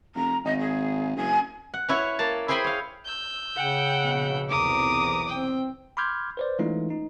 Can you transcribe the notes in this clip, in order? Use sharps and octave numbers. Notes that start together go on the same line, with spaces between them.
F1 A#5
G#1 D#5
G#4
F#1 G#5
F#5
C#4 E4 C#5 F#5
A#3 A5
E4 G#4 C5 G5 G#5 B5
C#5 F5
E6 G6
C#3 F#5 G5
A#1 B2
B1 E2 C3 A#4 D6 D#6
C4 G5
B5 C6 D6 F6 G6 G#6
B4 C5 D5
E3 G#3 A3 C#4 D#4 F4
D#4